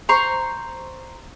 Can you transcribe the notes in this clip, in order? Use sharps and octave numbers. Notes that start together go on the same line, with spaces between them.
C5 A#5 C6 C#6